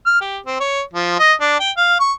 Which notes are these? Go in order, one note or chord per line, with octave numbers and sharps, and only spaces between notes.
F6
G4
C4
C#5
F3
D#5
D4
G5
F5
C#6